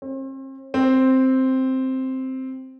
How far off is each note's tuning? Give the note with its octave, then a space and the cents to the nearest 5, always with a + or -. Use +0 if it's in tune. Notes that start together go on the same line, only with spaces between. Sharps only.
C4 +40
C4 +0